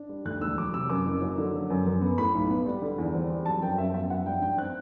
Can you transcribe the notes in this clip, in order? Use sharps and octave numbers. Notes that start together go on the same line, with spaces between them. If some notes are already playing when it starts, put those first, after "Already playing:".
Already playing: D4
G3
D2 F#6
E1 E6
F#3 D6
C3 E6
F#2 D6
F#1
F#3
D3
F#3
F#2
F#2
B3
A2 B5
B1
B3
G3
D3
E2
C4
G3
F#3 A5
F#2 G5
F#2 E5
B3 E5
F#3 F#5
G2 G5
G2 G5
C4 F#6